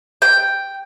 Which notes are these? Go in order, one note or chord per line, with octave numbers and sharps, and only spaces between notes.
G5